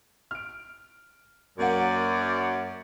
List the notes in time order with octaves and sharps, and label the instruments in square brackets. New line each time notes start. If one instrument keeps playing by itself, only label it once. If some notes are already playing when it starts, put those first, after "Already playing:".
[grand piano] F6 D7
[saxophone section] F#2 [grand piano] A#3 F#5 [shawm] D5